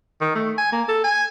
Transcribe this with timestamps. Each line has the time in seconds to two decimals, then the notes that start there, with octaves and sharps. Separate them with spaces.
0.21 D#3
0.35 A3
0.58 G#5
0.72 A#3
0.88 A4
1.04 G#5